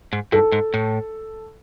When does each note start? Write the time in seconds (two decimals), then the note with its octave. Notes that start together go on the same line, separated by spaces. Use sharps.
0.13 G#2
0.32 G2 A4
0.52 G#2
0.74 A2